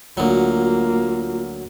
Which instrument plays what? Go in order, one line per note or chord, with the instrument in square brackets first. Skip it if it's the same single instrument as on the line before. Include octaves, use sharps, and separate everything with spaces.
[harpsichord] D2 F#3 [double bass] A#3 [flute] F4